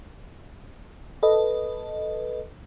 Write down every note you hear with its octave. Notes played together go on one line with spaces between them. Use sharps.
A4 B4 D#5